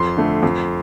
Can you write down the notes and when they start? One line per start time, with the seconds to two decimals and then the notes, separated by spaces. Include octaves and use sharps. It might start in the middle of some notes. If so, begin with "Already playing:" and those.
Already playing: F2 C6
0.17 D3 A3
0.43 F2